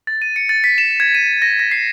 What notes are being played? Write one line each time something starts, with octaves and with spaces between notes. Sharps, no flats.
A6
D#7
C#7
A6
B6
E7
G#6
D#7
A#6
A#6
C7